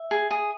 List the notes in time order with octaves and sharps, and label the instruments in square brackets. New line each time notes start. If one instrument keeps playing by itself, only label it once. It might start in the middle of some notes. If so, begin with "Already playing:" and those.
Already playing: [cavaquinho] E5
G#4
G#4